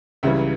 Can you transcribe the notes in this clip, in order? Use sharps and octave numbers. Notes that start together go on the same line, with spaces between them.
C#2 C#3 E3 G3 E5